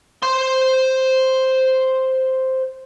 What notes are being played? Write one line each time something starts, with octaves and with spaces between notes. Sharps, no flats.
C5 C6